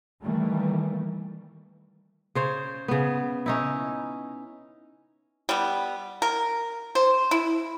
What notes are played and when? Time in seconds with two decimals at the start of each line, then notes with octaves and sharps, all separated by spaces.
0.23 D#3 E3 G3 A3 A#3
2.35 C#3 C5 C#5
2.88 C#3 B3
3.46 C#4 D#4 E4
5.49 G3 B3
6.22 A#4
6.95 C5
7.31 E4